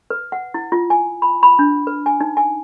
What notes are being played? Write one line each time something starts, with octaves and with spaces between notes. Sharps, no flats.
B4
F#5
E4
F4
G#5
B5
B5
D4
B4
G#5
D#4
G#5